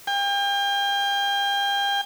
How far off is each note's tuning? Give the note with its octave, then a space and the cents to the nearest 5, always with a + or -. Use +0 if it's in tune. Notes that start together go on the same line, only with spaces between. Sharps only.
G5 +40